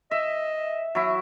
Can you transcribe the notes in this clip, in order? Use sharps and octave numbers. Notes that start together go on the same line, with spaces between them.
D#5 E5
F#3 E4